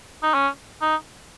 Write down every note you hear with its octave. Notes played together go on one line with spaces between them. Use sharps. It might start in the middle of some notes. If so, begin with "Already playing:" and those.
D#4
C#4
D#4